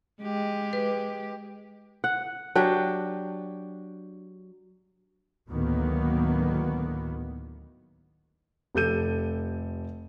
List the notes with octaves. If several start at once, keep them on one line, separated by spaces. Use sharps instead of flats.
G#3 G4
B4
F#5
F#3 D4 G4 G5
D2 A2 D#3 F#3 A#3 B3
F1 G4 A4 G6 D#7